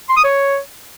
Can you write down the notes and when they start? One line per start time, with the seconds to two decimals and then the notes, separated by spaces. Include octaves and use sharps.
0.09 C6
0.17 D#6
0.24 C#5